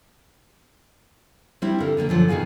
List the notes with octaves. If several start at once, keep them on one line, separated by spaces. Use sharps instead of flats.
G3 C4 D4 E4
D3 A#4 F5
B2 D3 G#3 A#3
F#2 D3 F3
B2 D#3 G#4 F5 G#5